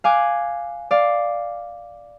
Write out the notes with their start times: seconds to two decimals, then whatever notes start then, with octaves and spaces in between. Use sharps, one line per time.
0.04 F5 G#5 D6 F#6
0.91 D5 F5